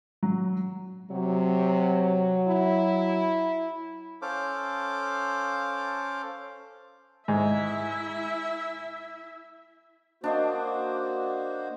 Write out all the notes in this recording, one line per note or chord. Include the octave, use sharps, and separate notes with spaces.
F#3
C3 F#3
E4
C#4 A4 C5 F5 D6
G#2 E4 E5
A#3 D4 F#4 C5 D#5 C6